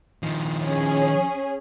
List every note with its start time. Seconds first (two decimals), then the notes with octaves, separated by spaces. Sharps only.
0.23 D#3 F3
0.63 C#4 G#4